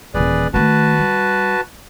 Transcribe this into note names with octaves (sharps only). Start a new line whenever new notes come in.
D#1 E3 G#4 B4 D5
D#3 A3 F#4 B4 A5
G3